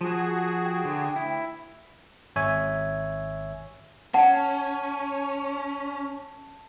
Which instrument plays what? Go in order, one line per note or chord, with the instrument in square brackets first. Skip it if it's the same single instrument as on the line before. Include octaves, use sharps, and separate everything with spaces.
[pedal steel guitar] F3 [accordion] F#4 G#4
[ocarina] G5
[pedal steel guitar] D3
[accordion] D2 [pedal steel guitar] E4
[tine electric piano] G#1 C#5 E5 G#5
[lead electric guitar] C#4 [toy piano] F#5 [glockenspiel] A5